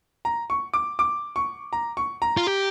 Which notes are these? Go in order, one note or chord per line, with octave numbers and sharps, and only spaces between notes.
A#5
C#6
D6
D6
C#6
A#5
C#6
A#5
F4
G4